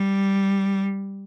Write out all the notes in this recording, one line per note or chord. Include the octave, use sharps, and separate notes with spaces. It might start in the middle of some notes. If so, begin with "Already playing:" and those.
Already playing: G3